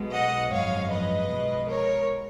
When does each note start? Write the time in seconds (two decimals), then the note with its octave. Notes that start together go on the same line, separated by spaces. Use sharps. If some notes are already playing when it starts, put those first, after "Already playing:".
Already playing: B1 B2 G#3
0.12 D#5 F#5
0.51 G#1 F#2 F3 G#3 C#5 F5
0.90 B4 D#5
1.29 B1 B2 G#3
1.68 A#4 C#5